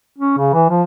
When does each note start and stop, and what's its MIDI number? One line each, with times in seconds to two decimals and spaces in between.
0.18 0.37 61
0.38 0.51 49
0.54 0.66 52
0.70 0.82 53